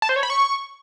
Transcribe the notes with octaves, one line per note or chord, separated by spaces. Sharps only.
A5
C5
C#5
B5
C#6